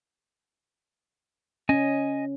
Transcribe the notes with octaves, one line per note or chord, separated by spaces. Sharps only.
C#4 D#5 G#5